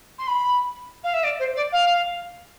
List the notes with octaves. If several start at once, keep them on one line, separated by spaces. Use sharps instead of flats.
C6
B5
F5
E5
D5
C5
D5
F5